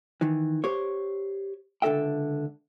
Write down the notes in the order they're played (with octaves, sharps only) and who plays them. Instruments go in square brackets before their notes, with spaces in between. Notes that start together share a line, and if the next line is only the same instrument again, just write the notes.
[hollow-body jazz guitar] D#3 E3
G4 C5 C#5
C#2 D3 G#4 A4 E5 G5